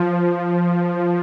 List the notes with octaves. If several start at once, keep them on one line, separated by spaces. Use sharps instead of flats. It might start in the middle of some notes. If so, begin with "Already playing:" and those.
Already playing: F3